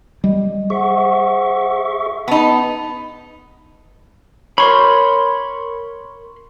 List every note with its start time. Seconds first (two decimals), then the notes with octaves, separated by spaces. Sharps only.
0.24 G3 D#5
0.70 G#4 C5 E5 F#5 C#6
2.28 B3 D#4 A5
4.58 A#4 C#5 B5 C6